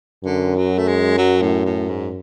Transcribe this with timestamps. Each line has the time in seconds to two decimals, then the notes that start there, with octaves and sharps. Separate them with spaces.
0.24 F#2 D3
0.56 F#3
0.78 A3
0.88 G#3
1.18 F#3
1.41 A2
1.66 A2
1.89 G#2